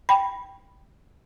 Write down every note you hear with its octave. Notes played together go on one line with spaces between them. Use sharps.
G5 B5